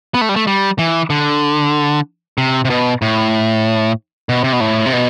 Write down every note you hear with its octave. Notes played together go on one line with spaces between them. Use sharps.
B3
A3
G3
A3
G3
E3
D3
C3
C3
B2
A2
B2
C3
B2
A2
C3
B2